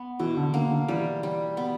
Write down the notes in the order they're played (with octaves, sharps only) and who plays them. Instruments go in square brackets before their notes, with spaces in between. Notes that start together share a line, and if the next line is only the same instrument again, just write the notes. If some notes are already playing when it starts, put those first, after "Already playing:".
Already playing: [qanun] B3
[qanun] B2 [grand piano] E3
[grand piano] D3
[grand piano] D3 [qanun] A#3
[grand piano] D3
[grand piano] E3 [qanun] G3
[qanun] G3
B3